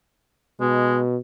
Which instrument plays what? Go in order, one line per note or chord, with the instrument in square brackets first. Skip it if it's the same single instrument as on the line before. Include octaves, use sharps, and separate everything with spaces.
[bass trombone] B2 [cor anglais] G#3